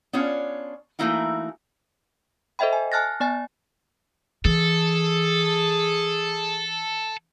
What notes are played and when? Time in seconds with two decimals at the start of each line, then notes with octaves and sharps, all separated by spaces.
0.13 B3 C#4 D4 F4 C#5
0.99 E3 A3 A#3 D#4 E4 F#4
2.59 A4 C5 D#5 E5 G5 B5
2.73 G#5
2.92 G#5 A5 F6 F#6 A6 A#6
3.20 B3 D5 G#5 A6
4.45 E3 G#4 A4